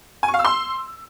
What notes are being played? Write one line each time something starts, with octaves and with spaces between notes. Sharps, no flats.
G#5
C#6
F5
E6
C6